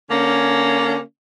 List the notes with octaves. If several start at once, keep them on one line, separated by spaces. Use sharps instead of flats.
D3 A#3 C#4